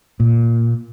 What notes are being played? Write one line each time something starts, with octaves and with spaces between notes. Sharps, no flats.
A#2